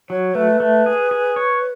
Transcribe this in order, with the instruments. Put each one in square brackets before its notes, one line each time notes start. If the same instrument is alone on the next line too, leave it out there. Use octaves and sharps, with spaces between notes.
[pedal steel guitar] F#3 [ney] C#5
[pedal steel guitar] A3 [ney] B4
[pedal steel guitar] A3
G#4
G#4
C#5